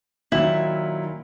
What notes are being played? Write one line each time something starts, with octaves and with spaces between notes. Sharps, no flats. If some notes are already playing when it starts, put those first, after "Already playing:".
A#2 D#3 F#3 E4